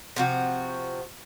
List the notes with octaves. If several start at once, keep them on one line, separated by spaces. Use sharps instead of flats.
C3 F3 F#4